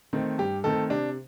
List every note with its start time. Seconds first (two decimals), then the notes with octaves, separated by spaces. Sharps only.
0.13 D#3 A3 C4
0.38 G2 G4
0.64 D#3 A3 C4 A4
0.90 C3 D4